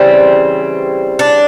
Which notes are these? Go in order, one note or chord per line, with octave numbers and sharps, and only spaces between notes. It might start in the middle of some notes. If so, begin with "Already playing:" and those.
Already playing: C#3 E3 G3 C4
D4